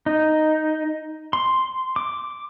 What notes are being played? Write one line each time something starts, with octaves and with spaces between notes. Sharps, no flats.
D#4
C6
D6